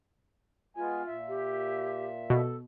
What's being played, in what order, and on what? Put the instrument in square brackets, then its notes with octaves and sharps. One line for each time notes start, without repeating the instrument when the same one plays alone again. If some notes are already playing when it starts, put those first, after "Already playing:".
[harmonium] G#3 B3 G#5 [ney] F4
[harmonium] A#2 E5
[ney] G4
[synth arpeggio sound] B2 [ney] A4